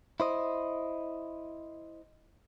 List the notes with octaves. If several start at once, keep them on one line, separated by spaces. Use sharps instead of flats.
E4 C5 D#5